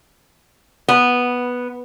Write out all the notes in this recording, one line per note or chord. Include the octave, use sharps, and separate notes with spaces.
B3